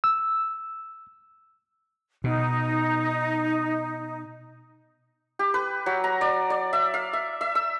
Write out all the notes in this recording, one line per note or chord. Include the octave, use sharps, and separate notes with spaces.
E6
B2 D#4
G4
B4
F#3
A#5
D5
D5
E5
F5
E5
E5
E6